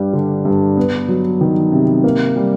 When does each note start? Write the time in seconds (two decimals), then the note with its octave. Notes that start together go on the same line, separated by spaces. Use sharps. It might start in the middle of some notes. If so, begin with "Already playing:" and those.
Already playing: G2 G3
0.13 D3
0.45 G2
0.77 B3
1.08 F#3
1.41 D#3
1.72 C3
2.04 A#3
2.36 G3